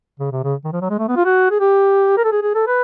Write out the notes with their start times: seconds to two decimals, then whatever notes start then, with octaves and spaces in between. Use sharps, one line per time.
0.20 C#3
0.32 C3
0.44 C#3
0.64 D#3
0.73 F3
0.81 F#3
0.90 G#3
0.99 A3
1.08 B3
1.16 F4
1.25 F#4
1.51 G#4
1.60 G4
2.17 A#4
2.24 A4
2.32 G#4
2.43 G#4
2.55 A4
2.68 B4